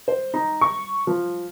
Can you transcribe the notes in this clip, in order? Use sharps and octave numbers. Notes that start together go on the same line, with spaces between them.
C5
D#4
C#6
F3